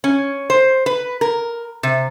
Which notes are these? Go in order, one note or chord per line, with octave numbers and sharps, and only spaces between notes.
C#4
C5
B4
A#4
C3